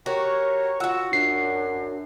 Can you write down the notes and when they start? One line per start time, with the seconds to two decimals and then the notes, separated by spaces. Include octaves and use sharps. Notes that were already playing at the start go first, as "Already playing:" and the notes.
0.06 F#4 G4 A#4 C#5
0.80 F4 F#4 F#5 E6
1.13 F#2 D4 C7